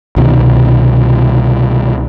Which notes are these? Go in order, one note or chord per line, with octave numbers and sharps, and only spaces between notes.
C2 B2 D#3